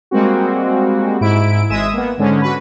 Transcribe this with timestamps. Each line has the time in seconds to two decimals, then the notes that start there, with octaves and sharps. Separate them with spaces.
0.11 G3 G#3 A#3 C4 F#4
1.21 G#2 E4 D7
1.70 G#1 G#3 E5 D#6 G#6 E7
1.93 A#3 B3
2.18 G#2 D3 G#3 C#4
2.42 F#4 B4